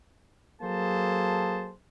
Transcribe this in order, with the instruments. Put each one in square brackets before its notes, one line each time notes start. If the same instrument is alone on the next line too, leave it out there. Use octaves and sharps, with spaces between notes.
[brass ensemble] F#3 A#3 G#4 A4 C5 A5